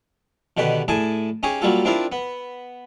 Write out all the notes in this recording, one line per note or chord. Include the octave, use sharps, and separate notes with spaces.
B2 D3 D#3 G4 B4
A2 G#4 D5 G#5 A5
C#4 D#4 G4 G#4 C#5
F#3 G3 A#3 F4 A4
C4 D4 E4 F4 A#4 D5
B3